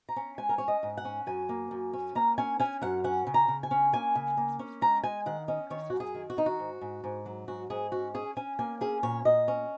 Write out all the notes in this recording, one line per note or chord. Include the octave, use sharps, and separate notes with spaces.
A#5
C#4
G#3 G#5
A#4
C#4 C#5
D#5
G#2
F#5
C#4
F#2 G#5
A#3
F#2
C#4
A#3 A#5
C#4 G#5
C#4 G#5
F#2 F#5
C#4 F#5
C#3
A#5
C#3
G#5
C#4
A#3 G#5
C#3
A#3
C#4
G#3 A#5
G#3 G#5
D#3 F#5
C#4 D#5
D#3 C#5
F#2 F#4
G#4
D#3
F#4
D#3 D#4
F#4
G#2
G#2
G#2
F#3
G#2 F#4
G#2 G#4
C#4 F#4
C#4 G#4
C#4 G#5
A#3 G#5
C#4 G#4
A#2 C#5
A#2 D#5
C#4